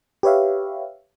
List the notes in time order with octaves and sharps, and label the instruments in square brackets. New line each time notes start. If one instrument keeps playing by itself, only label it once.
[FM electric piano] G4 B4 C#5 E5 F5